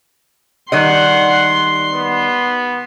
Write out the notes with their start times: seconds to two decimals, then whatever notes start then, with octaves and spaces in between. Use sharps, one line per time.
0.72 D#3 G3 D#5 F#5 C6
1.93 B3